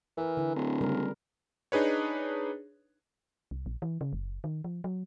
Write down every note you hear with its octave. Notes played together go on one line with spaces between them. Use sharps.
E3 A#4 B4
D3 E4
D1
C#3 G3 A#4
D4 D#4 G#4 B4 C#5
C2
A#1
E3
C#3
F#1
D#3
F3
F#3